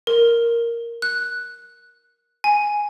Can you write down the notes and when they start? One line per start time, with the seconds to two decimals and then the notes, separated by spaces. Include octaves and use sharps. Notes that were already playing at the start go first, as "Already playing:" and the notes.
0.07 A#4
1.02 F#6
2.44 G#5